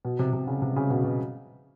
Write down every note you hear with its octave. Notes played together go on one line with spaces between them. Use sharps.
B2
C3
C3
C#3
C3
C#3
B2
B2